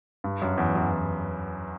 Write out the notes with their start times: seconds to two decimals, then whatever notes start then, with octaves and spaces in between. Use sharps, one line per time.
0.24 G2
0.42 F#2
0.58 E2
0.75 F#2
0.92 E2